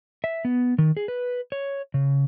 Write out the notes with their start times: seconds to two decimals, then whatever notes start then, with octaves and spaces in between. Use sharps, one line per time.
0.24 E5
0.45 B3
0.78 D#3
0.97 G#4
1.08 B4
1.52 C#5
1.94 C#3